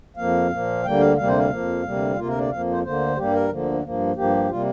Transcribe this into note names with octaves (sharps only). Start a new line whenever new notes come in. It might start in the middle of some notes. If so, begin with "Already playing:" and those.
F2 F3 A#3 F5
A#2 F3 A#3
D2 D3 G3 A#3 G5
F5
D2 C3 G3 A#3 F5
C5
F5
F2 F3 A#3
D2 C3 G3 A#3
D2 C3 A#3 F4
A#4
D5
F2 F3 A#3 F5
C5
D2 D3 A#3 C5
G2 G3 A#3 G4
A#4
D2 D3 F3 A#3
G2 F3 A#3
G2 F3 A#3 G4
C3 G3 A#3 F4